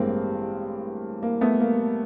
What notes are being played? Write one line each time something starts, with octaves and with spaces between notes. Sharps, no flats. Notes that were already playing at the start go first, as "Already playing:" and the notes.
Already playing: A1 G2 E3 G#3 A#3 C4
A#3
A3 B3
A#3